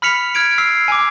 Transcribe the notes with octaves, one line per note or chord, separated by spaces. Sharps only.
B5 F6 B6 C#7 F7
F6 G#6 D7
E6 F6 C7
G#5 D6